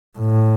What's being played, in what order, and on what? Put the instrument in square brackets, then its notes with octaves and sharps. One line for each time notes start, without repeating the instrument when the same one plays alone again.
[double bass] A2